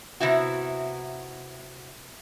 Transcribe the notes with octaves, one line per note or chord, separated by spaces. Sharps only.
C3 B3 E4 F#4